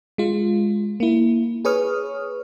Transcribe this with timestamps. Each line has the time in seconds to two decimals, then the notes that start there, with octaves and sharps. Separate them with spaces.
0.18 G#3 F4
1.00 A#3 E4
1.65 G#4 B4 C#5 C#6 D#6 F6